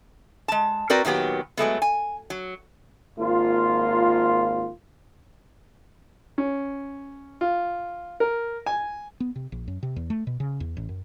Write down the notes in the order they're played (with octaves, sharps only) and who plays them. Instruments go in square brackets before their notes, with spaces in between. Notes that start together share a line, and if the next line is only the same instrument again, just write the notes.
[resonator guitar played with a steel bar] G#3 A5
C4 F#4 A#4 B4 D5
A#2 D#3 F#3 B3 G4
F#3 G#3 A3 B3
G#5
F#3
[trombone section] G#1 A#3 F4
[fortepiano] C#4
F4
A#4
G#5
[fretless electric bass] B3
C3
A#1
F#2
C3
E2
A3
B2
C#3
E2
A1
F#2